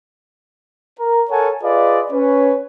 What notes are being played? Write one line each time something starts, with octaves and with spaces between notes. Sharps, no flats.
A#4
A4 A#4 C#5 F#5 G#5 A5
F4 G#4 B4 D5 D#5 F5
C#4 B4 C#5